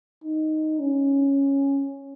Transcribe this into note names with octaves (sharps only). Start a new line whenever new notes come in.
D#4
C#4